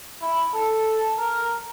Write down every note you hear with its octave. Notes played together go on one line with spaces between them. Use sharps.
E4
A4
A#4